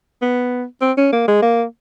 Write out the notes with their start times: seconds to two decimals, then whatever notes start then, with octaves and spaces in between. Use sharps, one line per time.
0.22 B3
0.82 C4
0.97 C#4
1.13 A#3
1.28 G#3
1.42 A#3